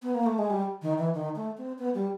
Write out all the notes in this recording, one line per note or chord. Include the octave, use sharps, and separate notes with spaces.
B3
A#3
A3
G#3
G3
D#3
E3
D#3
A3
C4
B3
G3